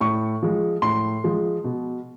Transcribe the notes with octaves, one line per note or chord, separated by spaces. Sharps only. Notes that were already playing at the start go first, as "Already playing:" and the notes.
A2 C#6
F3 G#3
A2 C6
F3 G#3
B2